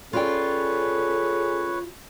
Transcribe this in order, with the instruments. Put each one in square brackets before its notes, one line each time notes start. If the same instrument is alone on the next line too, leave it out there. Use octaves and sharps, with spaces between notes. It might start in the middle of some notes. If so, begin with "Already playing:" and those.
[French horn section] C#4 G#4 A4 [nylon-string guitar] F4 D5 G5 [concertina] B4 C#5